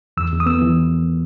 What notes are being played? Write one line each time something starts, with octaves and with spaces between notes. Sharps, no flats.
E2 E6
E2
D#6
B3 E6
E3